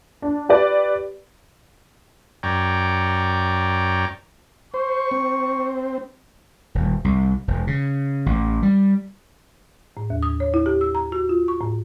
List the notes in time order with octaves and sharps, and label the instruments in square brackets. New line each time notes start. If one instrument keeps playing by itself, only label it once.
[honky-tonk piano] D4
G4 B4 D5
[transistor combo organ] F#2 C#5 D5 G5 A#5
[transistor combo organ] C5 [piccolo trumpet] C#6
[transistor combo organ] C4
[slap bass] D#1
C2
E1
C#3
A1
G3
[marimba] A2
D#2
D#6
C#5
E4
G4
E6
A#5
F#4
F4
C#6
A2